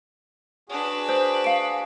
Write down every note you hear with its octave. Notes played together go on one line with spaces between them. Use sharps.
D4 F#4 G#4 B4
C5
F5 D7